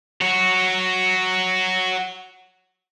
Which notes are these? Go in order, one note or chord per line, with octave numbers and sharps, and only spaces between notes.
F#4 C#5